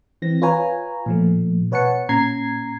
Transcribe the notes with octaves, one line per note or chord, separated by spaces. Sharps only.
E3 C4 A#6
F4 B4 C#5 G#5 A#5
A#2 F3 A3
B2 B4 C#5 F#5 A5 C#7
A#2 C#4 A#5 G#6 C7